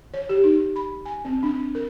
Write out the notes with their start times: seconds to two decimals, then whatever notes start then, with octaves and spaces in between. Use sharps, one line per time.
0.14 C#5
0.29 G4
0.44 D#4
0.76 B5
1.05 G#5
1.25 C4
1.43 D4
1.75 A#4